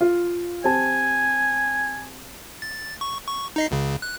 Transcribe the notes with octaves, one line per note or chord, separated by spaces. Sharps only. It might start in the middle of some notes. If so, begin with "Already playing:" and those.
F4
C4 G4 G#5 A5
A6
C#6
C#6
D#4 D#5 C7
C#2 C#3
F#6